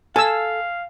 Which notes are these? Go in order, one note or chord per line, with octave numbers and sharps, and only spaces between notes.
A4 F5 G#5 E6